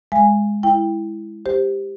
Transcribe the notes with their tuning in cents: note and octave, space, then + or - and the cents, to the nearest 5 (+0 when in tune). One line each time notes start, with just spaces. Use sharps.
G#3 -5 F5 -40 G#5 -10
E4 +0 G5 +5
G4 +5 C5 +0